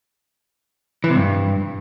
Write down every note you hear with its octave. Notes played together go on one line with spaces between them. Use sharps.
E3
C3
G2